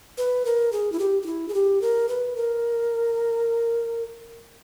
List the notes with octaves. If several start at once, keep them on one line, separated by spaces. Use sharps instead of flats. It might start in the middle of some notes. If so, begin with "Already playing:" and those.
B4
A#4
G#4
E4
G4
G4
E4
G#4
G4
A#4
B4
A#4